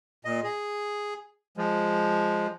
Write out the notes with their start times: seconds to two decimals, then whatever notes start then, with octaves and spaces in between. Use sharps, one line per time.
0.25 A#2 D#5
0.43 G#4
1.57 F3 G#3